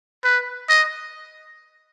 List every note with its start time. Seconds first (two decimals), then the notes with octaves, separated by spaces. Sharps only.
0.24 B4
0.69 D#5